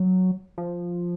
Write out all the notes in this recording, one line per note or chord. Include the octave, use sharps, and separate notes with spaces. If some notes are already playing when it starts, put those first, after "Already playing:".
Already playing: F#3
F3